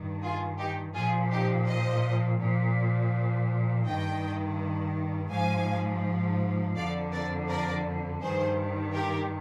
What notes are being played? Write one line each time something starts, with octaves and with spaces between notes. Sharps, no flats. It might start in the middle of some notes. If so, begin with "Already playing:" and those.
Already playing: G2 D#3
F4 G#4
D#4 G4
A#2 F3 F4 G#4
D#4 G4
C5 D#5
A#2 F3
G2 D#3 D#5 G5
G#2 F3 F5 G#5
F2 D3 F3 D5 F5
A#4 D5
A#4 D5
G2 D#3 G#4 C5
G4 A#4